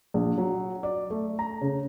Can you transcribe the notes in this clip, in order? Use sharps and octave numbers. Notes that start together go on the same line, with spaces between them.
A#1
F#3
D5
A3
A#5
C#3